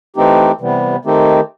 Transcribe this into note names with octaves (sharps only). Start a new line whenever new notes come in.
E3 A3 C4 D#4 G4
C3 E3 G3 B3
D#3 A3 C4 D#4 G4